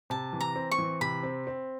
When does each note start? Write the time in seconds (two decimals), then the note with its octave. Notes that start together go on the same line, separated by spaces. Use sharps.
0.10 C3 A5
0.33 E3
0.41 A#5
0.56 C4
0.71 C#6
0.78 E3
1.01 C3 B5
1.23 C4
1.47 C4